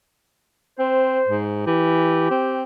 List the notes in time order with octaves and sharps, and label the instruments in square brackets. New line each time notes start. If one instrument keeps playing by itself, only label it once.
[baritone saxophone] C4 [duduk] C5
[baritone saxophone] G#2
[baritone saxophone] E3 [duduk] G4
[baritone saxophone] C4